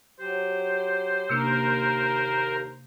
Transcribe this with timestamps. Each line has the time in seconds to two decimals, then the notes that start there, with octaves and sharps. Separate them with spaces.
0.20 F#3 G4 C5
1.29 D#2 C3 A#3 D4 A#4